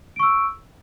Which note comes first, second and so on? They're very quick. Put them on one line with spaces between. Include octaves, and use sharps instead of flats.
D7 C#6 E6